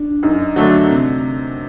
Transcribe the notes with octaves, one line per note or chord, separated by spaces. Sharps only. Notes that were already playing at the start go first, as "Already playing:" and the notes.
Already playing: D4
F#2 D#4
D3 F#3 A3 D4
C3